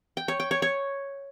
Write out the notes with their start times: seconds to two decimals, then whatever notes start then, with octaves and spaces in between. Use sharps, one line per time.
0.17 G5
0.28 C#5
0.40 G5
0.51 C#5
0.62 C#5